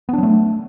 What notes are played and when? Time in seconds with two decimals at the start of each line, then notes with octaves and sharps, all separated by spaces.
0.09 B3
0.13 D4
0.18 F#3
0.23 A3